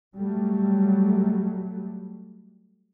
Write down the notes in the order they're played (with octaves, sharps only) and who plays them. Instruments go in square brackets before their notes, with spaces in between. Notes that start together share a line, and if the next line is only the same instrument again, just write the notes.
[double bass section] F#3 G3 A3